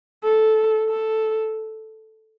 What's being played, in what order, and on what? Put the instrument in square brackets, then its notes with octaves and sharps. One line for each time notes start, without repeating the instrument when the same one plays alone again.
[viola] A4
A4